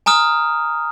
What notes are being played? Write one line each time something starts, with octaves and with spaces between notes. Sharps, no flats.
G#5 A#5 D#6 F6